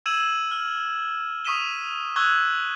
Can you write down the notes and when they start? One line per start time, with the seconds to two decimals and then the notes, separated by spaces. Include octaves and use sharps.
0.06 E6 G#6 D#7 E7 F#7
0.51 F6
1.45 C#6 D#6 B6 D#7 E7 G7
2.16 C#6 E6 F#6 G#6 G7